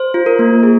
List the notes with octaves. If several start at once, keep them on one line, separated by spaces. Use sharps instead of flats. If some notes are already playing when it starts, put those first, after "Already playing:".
Already playing: C5
F4
A#4
A#3
G#4